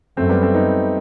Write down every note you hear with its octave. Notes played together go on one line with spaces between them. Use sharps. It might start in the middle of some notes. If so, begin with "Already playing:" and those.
F#2 A3 C4
G3 B3
A3 C4
B3 D#4